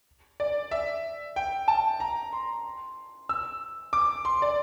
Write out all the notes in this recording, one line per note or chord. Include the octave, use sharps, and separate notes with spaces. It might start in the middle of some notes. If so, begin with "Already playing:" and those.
D5
E5
G5
A5
A#5
C6
E6
D6
C6
D5